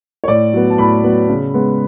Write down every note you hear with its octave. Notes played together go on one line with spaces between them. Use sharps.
C#5
A2 D5
F#3 B3
A5
A2 B5
F#3 B3
C#3
G#3 B3